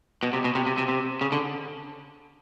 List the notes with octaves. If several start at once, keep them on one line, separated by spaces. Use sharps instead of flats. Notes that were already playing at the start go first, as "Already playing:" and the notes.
B2
C3
B2
C3
C3
C3
C3
C#3
D3